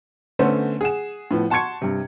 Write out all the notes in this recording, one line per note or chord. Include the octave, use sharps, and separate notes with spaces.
D3 A3 B3 C#4 C5
G#4 F#5 E7
A2 F3 B3
F#5 A5 C6 C#6 G#6 C#7
G2 C3